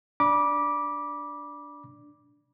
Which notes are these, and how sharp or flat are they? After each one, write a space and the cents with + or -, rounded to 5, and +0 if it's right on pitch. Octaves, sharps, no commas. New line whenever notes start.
D4 -5 B5 -30 D6 +0